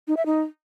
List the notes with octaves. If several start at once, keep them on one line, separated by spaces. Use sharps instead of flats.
D#4
E5
D#4